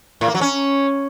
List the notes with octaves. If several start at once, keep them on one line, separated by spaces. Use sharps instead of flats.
A2
A#3
F#3
C#4